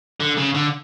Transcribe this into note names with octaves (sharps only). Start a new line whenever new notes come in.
D3
C#3
D3